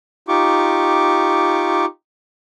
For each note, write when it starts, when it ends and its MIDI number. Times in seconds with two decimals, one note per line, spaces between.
0.28 1.85 63
0.28 1.85 65
0.28 1.85 67
0.28 1.85 85
0.28 1.85 86